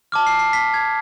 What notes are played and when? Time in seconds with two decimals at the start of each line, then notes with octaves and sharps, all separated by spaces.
0.12 A5 D6 F6
0.27 C7
0.39 C7
0.53 B6
0.74 G#6